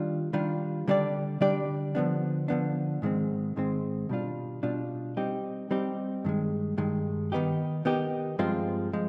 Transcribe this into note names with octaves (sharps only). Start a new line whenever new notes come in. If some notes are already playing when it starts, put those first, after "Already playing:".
Already playing: D#3 G3 D4 F4
D#3 G3 D4 F4
D3 G3 D4 G4 D5
D3 G3 D4 G4 D5
D3 F3 B3 D4
D3 F3 B3 D4
G#2 D#3 G#3 C4
G#2 D#3 G#3 C4
B2 G3 D4 F4
B2 G3 D4 F4
G3 C4 D#4 G4
G3 C4 D#4 G4
G2 D#3 G#3
G2 D#3 G#3
D#3 B3 D#4 G4
D#3 B3 D#4 G4
G2 F3 G#3 C4 F4
F3 G#3